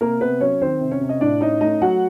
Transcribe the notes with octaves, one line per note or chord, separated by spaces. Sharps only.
C3 A#3 A#4
C3 B3 B4
F#3 C#4 C#5
D#3 C4 C5
C3
C#4 C#5
C3
D#5
A2 D4 D5
C#4 D#4 D#5
A3 D#4 D#5
F#3 F#4 F#5